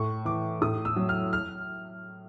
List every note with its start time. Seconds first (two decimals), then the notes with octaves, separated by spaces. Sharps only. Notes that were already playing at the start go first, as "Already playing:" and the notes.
Already playing: A2 C#6
0.25 E3 D6
0.61 A2 D#6
0.85 E6
0.96 F#3
1.09 F6
1.33 F6